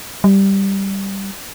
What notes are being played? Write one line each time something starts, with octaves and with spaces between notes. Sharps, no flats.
G3